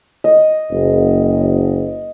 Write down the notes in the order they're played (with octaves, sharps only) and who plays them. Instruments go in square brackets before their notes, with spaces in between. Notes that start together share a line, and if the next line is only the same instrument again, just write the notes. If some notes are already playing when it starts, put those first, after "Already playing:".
[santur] D#5
[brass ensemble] F#1